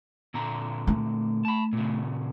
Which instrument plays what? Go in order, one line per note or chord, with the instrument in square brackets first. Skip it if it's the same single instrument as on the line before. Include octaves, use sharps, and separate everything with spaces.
[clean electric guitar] A#2 D3 A#5
[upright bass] A3
[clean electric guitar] A5 B5
A#2 C#3